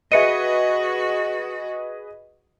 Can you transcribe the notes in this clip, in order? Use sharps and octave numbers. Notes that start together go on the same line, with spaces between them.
F#4 G#4 B4 D#5 E5 C#7 D#7